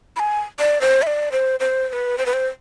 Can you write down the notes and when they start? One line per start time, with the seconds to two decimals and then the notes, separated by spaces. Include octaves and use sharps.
0.16 B5
0.19 G#5
0.59 D5
0.81 C5
1.02 E5
1.07 D5
1.32 C5
1.60 C5
1.89 C5
1.93 B4
2.18 C5
2.26 B4
2.33 C5